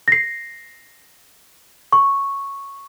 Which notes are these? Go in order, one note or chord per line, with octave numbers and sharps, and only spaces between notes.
A#6 C7
C#6